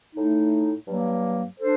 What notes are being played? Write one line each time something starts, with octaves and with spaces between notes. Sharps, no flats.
A2 A3 D#4
G2 F#3 A#3
D4 A4 C5